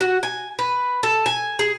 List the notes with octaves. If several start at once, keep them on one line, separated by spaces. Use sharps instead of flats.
F#4
G#5
B4
A4
G#5
G#4